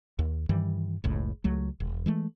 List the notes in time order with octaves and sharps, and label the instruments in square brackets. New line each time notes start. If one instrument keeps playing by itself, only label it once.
[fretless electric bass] D#2
G2 D#3 E3 G3
F#1 C#2 A2
C#2 F#3 A3
E1
E3 G#3 A3